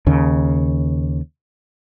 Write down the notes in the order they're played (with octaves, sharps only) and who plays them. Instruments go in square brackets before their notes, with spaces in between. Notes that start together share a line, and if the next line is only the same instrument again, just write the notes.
[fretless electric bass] D#2 C#3